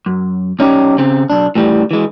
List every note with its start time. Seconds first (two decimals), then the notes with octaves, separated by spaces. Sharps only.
0.06 F#2
0.59 B1 C#4 D#4 E4 G4
0.98 C#3 C4
1.30 B1 D4
1.55 A2 E3 G3
1.91 E3 G#3